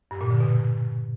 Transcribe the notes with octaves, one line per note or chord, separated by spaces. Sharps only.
G2
A#2
D3
B2